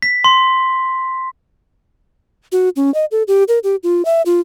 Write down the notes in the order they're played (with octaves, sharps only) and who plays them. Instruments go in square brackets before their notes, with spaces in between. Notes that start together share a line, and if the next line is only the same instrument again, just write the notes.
[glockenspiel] B6
C6
[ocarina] F#4
C#4
D#5
A4
G4
A#4
G4
F4
E5
F4